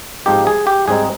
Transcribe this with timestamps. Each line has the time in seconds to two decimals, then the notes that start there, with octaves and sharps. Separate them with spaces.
0.26 G#2 F3 C4 D#4 G4
0.47 G#4
0.67 G4
0.88 G#2 G3 C4 D#4 G#4